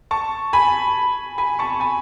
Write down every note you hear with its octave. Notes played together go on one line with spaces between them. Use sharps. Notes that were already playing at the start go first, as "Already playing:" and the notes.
A5 C#6
G#5 B5
G#5 B5
A5 C#6
G#5 B5